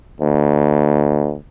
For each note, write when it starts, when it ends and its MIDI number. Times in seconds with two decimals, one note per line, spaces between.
0.21 1.36 38